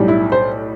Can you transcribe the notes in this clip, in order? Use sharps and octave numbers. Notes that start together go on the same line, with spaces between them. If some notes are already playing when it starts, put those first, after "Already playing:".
Already playing: B1 A2 G3
E4
C5